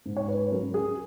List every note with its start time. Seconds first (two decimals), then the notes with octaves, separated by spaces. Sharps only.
0.06 G#2
0.17 C#5
0.28 B4
0.51 F#3 C#4 A#4
0.74 G#4